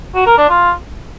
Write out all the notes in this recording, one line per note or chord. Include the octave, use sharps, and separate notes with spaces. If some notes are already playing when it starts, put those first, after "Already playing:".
F#4
A#4
D4
F4